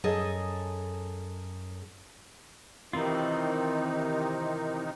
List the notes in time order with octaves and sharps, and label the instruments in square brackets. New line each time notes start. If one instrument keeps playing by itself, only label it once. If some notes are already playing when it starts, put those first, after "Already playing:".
[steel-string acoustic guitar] F#2 G#4 A4 D#5
[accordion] C3 D#3 D#4 [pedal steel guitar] E3 C4 F4